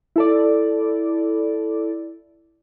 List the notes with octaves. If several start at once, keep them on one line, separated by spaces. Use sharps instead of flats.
E4 A4 D5